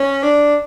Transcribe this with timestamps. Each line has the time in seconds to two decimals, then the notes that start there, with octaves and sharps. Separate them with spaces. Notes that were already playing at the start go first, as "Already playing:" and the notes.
Already playing: C#4
0.23 D4